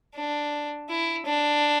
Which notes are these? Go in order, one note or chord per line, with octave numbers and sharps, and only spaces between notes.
D4
E4
D4